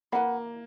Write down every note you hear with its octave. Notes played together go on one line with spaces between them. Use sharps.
A#3 B4 F#5 B5